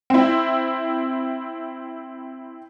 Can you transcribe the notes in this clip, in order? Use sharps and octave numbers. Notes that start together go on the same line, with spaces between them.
C4 E4